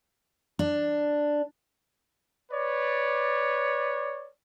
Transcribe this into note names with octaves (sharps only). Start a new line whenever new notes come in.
D4
B4 C#5 D5